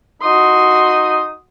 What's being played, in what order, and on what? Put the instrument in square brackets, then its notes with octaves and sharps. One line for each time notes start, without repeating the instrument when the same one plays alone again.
[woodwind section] D#4 D#6 [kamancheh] F#4 C6